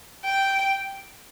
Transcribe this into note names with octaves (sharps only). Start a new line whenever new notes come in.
G5